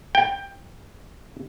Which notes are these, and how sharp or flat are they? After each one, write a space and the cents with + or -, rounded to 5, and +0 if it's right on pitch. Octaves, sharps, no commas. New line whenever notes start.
G5 +15